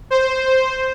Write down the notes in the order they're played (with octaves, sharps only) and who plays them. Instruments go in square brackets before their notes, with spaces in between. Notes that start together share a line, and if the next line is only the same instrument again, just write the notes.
[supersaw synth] C5